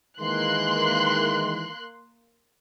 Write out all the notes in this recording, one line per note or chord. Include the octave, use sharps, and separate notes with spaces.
D#3 E3 G#3 A#3 C6 F#6